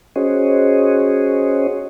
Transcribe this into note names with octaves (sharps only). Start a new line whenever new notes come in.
C#4 F#4 G#4 C5 C#5 D#5